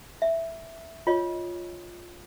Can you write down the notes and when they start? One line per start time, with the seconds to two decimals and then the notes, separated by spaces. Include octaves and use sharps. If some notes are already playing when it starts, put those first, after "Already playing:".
0.22 E5
1.07 F4 C#5 D#5